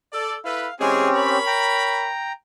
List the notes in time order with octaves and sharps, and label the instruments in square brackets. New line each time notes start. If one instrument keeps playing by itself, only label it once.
[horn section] A4 D5
[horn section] E4 A4 B4 [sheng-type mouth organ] F5
[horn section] E3 G#3 G#4 [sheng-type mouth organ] C4 C#4 G4
[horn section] A#4 C#5 B5
[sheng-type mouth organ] G5 A#5